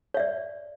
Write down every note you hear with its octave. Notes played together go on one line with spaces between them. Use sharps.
C#5 D5 E5